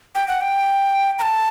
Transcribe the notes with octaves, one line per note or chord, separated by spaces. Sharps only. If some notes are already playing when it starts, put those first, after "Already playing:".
G5
F#5
G5
A#5
A5